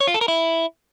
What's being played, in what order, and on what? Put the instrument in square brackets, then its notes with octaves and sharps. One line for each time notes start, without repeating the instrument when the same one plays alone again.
[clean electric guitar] C#5
F4
A4
A#4
E4